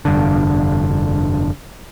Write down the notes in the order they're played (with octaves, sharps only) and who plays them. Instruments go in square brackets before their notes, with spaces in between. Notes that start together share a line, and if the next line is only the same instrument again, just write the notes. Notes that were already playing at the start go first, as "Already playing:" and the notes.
[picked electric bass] F1 G2 D3